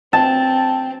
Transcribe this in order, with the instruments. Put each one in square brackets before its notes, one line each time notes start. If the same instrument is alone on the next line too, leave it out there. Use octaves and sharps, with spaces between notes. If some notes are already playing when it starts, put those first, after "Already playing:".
[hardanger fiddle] C4 [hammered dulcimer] A5